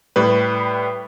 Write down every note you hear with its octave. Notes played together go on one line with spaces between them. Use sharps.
A2 G3 B4